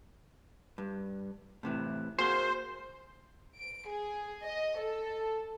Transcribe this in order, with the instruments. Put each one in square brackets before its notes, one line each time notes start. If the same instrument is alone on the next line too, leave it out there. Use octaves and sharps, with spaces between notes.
[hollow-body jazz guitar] G2
A2 C3 E3
[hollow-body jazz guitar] A#3 F#4 G#4 [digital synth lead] C5
[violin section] D7
G#4
D#5
A4